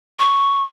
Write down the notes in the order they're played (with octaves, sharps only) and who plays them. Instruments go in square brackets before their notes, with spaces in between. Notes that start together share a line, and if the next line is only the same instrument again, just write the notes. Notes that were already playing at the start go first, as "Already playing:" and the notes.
[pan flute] C#6